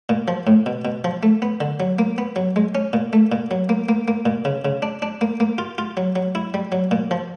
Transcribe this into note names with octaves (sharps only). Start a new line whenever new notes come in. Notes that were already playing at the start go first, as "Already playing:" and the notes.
A#2
F3
A2
B2
B2
F3
A3
B3
D3
F#3
A#3
B3
F#3
G#3
C#4
A#2
A3
A#2
F#3
A#3
A#3
A#3
A#2
C#3
C#3
D4
D4
A#3
A#3
F4
F4
F#3
F#3
E4
G3
F#3
A#2
F3